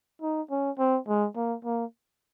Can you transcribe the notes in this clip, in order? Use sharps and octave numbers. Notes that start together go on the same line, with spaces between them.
D#4
C#4
C4
G#3
A#3
A#3